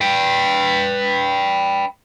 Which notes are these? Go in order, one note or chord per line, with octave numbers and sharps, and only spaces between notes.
B4 G5